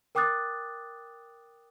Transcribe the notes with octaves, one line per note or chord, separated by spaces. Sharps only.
A#4 G5 D6 D#6 F#6 A6